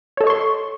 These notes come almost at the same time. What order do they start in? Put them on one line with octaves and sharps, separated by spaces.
C#5 A4 D#5 C#6 C6